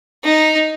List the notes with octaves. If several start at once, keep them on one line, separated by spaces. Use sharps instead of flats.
D#4